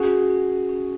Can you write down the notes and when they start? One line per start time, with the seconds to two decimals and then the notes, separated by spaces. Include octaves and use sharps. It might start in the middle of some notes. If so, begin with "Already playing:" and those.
Already playing: C#4 F#4 G#4
0.30 C#4
0.69 C#4